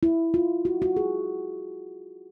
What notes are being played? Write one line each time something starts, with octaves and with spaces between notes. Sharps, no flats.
E4
F4
F#4
F#4
G#4